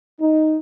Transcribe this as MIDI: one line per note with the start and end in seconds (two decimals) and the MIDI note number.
0.20 0.57 63